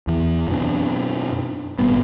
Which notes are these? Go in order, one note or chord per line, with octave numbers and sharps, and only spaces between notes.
E2 E3
F#2 B2 D4
G#1 A#2 G3 B3